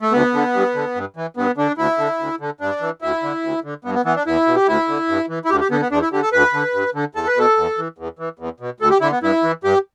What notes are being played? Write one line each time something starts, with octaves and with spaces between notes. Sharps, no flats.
A3
D2 B3
D3
G2
D3
G2
E3
G2 B3
D3 D4
D2 E4
D3
D2
D3
G2 D4
E3
D2 E4
D3
D2
D3
G2 B3
B3
E3 B3
D4
E2 E4
B2
G4
D2 E4
D3
G2
E3
E4
D2 G4
G4
D3 B3
B3
E2 D4
E4
D3 G4
A4
D2 B4
D3
G2
D3
E2 A4
B4
B2 A4
E2
E3
E2
E3
E2
B2
D2 A4
G4
D3 E4
B3
G2 E4
E3
G2 G4